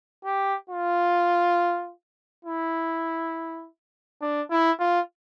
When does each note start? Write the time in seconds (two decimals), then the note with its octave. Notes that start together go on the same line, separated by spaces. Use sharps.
0.25 G4
0.69 F4
2.45 E4
4.21 D4
4.51 E4
4.79 F4